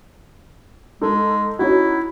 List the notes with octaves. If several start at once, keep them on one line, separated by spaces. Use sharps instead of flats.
G#3 D#4 A4
C#4 D#4 E4 F#4